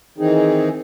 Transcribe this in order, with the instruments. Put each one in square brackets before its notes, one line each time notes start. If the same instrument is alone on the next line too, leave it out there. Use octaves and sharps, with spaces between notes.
[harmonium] D#3 E3 C4 D#4 G#4